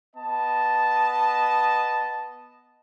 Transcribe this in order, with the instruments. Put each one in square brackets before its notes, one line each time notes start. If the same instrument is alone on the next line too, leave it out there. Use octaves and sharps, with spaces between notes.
[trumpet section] B3 D#5 A5